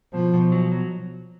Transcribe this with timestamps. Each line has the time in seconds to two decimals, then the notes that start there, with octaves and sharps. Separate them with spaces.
0.13 B2 F3
0.34 B2
0.52 F#3
0.72 F#3